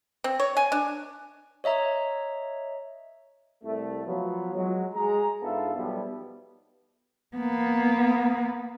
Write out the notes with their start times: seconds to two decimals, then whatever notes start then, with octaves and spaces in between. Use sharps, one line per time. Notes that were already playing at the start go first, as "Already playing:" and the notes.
0.24 C4
0.40 C#5
0.57 G#5
0.72 D4
1.64 C#5 D#5 E5 A#5
3.64 C2 A3
4.06 F3 F#3 B3 F4
4.54 F#3 G#3
4.94 G#3 A#5
5.42 G#2 B3 D4 F4 A4 E5
5.76 B1 B2 F3 G3 B3
7.37 A#3 B3